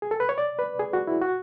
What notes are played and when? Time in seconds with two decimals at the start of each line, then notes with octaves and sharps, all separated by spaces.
0.02 G#4
0.11 A4
0.20 B4
0.29 C#5
0.38 D5
0.59 B4
0.79 G#4
0.93 F#4
1.07 E4
1.21 F#4